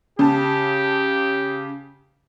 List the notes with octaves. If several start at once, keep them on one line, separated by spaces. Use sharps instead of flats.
C#3 G4 A5